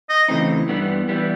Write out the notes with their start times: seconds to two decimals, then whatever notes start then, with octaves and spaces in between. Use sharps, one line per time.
0.09 D#5
0.28 C#3 E3 A3 C4 D#4
0.69 G2 E3 G3 B3
1.09 E3 G3 B3